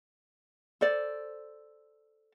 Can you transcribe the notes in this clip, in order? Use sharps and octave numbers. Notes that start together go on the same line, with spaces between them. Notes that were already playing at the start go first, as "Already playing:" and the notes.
A4 C5 D5